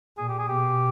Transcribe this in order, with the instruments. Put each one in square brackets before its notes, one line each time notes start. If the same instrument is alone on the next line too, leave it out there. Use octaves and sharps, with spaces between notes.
[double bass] A#2 [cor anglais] G#4
[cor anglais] G4
G#4
[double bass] B2 [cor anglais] G4